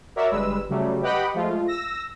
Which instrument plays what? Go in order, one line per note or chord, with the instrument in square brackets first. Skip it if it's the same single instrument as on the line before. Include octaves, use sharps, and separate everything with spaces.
[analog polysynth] F#4 A#4 C#5 D5 E5
G1 G3 G#3 B4 E6
C#3 F#3 G3 A3
G4 B4 D#5 F#5 G5 B5
F3 G#3 A3 F4
E6 A#6